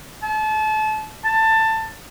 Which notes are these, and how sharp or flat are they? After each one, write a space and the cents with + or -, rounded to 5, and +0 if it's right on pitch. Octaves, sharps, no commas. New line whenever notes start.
A5 -30
A5 +15